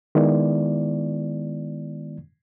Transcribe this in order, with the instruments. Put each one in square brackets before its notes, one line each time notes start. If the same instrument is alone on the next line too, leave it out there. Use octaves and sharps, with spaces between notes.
[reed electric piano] D#3 G#3 B3 E4 D5